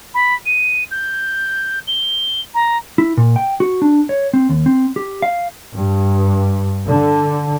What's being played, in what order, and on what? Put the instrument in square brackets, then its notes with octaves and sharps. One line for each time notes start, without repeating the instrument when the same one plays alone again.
[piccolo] B5
D#7
G6
G7
A#5
[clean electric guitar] E4
A#2
G5
F#4
D4
C#5
C4
D#2
C4
G4
F5
[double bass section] G2
D3